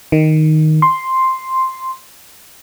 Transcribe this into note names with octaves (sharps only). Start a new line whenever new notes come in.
D#3
C6